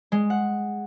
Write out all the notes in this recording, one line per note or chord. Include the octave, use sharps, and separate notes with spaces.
G#3
F#5